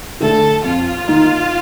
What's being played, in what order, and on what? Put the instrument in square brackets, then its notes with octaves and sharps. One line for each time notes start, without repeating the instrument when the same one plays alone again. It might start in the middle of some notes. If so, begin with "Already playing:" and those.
[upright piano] D3 A3 [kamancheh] A4
[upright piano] F2 [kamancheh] F4
[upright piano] D#3 A#3 D#4